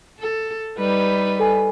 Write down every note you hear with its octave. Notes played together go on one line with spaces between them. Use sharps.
A4
G3 D#4 B4
A4 G#5